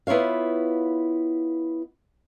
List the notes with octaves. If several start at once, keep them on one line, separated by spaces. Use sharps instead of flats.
B3 E4 F4 C#5 F5